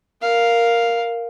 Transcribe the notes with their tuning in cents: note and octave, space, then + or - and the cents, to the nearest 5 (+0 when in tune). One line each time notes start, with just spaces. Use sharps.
A#4 +0 F5 +0